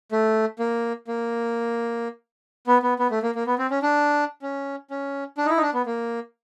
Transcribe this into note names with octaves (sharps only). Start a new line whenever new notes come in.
A3
A#3
A#3
B3
B3
B3
A3
A#3
A#3
B3
C4
C#4
D4
C#4
C#4
D4
D#4
E4
D#4
D4
B3
A#3